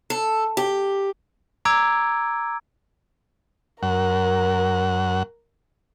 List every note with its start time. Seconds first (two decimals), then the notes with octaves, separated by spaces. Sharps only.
0.10 A4
0.57 G4
1.65 A#5 D6 E6 G#6 D7
3.83 F#2 A#4 F#5